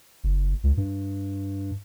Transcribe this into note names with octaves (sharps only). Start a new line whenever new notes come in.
F#1
C#2
G2